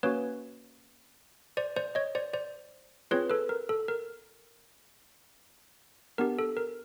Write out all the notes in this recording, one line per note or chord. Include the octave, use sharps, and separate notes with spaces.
A#3 C#4 F#4 B4 C#5
C5 D5
C5 D5
C#5 D#5
C5 D5
C5 D5
C4 F4 G#4 B4 C#5
A4 B4
A#4
A4
A#4
B3 D4 G4 A#4
A4
A#4